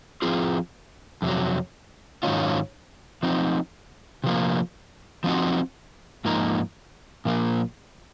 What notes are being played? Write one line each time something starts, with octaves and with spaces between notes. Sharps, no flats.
F3 C4 F4 G#4
F2 C3 F#3
G#2 D#3 F#3 C#4 F4
F3 C4 D#4
C3 F3 A#3
F3 C4 D#4 F#4
G#2 F3 A#3 D#4 A#4
A#2 F3 A#3